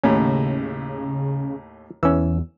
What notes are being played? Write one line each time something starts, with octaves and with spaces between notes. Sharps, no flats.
D#2 A2 C#3 C#4
E2 E3 C#4 E6